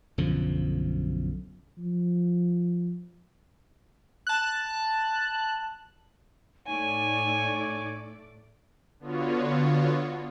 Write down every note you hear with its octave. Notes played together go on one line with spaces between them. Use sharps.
B1 F#2 D3 F3
F3
A5 F#6
A2 A3 D#4 C#5 D5 G#5
D3 B3 F4 F#4 C#5